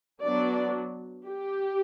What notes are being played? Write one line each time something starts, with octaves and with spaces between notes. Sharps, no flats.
F#3 B3 D4 D5
G4